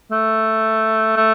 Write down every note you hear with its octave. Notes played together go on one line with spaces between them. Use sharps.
A3
A3